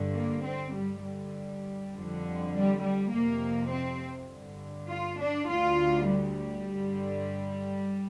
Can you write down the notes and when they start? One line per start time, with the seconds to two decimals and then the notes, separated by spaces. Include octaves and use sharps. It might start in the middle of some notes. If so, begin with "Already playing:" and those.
Already playing: G2 D3
0.16 A#3
0.46 C4
0.75 G2 D3 G3
1.05 G3
1.94 F2 D3
2.54 G3
2.82 G3
3.12 F2 C3 A#3
3.72 C4
4.31 G2 D3
4.91 F4
5.21 D4
5.50 D2 D3 F4
6.10 G3
6.68 G2 D3